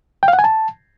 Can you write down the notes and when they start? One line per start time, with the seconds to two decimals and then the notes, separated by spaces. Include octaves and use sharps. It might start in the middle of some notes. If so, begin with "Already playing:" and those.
0.23 G5
0.28 F5
0.33 F#5
0.39 G#5
0.44 A5